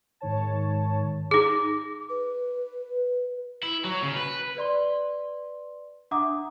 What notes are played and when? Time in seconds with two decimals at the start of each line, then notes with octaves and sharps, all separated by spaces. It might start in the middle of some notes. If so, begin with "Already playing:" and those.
0.20 G#2 D#3 C#5 A5
1.31 D#4 G#4 D6
2.10 B4
3.63 E4
3.84 F#3
4.02 C#3
4.16 B4
4.57 B4 D5 C6 G7
6.11 D4 E5 F#5 A#5 D6 D#6